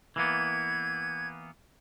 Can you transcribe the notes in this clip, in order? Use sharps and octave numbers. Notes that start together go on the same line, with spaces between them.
E3 A#3 B3 G#6